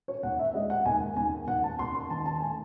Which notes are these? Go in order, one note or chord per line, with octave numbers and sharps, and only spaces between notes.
C#5
D#2 F#5
E5
G#3 D#5
F#5
D#2 G#5
D#2 G#5
D#2 F#5
A5
D#2 C6
C6
D#3 A5
A5
A3 G#5